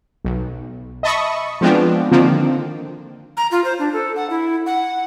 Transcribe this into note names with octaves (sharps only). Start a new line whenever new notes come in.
B1
D#5 E5 A5 B5 C#6 D#6
F3 G#3 B3 C4 D4 F4
D3 D#3 F3 A#3 C4
A#5
F4
C5
D4
A4
F#5
E4
F#5